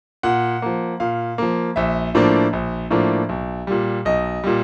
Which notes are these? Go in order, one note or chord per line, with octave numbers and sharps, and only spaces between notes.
A#2 F#5
F3 A#3
A#2 F5
F3 A#3
A#1 E5
A2 F3 A#3 D4
A#1
A2 F3 A#3 D4
B1
A#2 G3
B1 D#5
A#2 G3